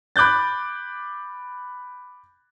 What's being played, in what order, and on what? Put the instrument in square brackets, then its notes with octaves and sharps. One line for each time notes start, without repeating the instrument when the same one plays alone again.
[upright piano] B5 D6 F#6 G6 A6